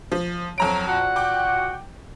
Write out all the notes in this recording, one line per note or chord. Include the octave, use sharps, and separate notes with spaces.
F3
F2 F#3 A#5 D7
A#2 F#4 F#5
G5 D6